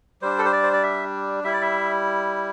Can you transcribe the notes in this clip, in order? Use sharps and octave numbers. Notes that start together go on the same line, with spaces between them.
G3 D4 C5
A4
C5
D5
C5
D5
E5
G3 E4 E5
D5
E5